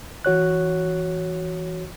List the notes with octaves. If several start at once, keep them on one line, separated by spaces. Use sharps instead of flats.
E3 F#4 C#5 F#6